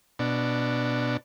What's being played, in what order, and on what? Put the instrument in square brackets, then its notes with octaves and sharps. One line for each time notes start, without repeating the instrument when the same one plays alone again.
[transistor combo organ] B2 D4